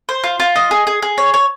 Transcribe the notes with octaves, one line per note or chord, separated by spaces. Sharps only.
C5
F4
F4
D#5
G#4
G#4
G#4
C#5
C#5